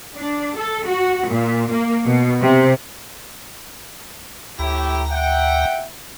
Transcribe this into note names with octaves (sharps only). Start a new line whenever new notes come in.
D4
A4
F#4
A#2
A#3
B2
C3
D2 A2 E4 G4 A#5
E5 F#5 G5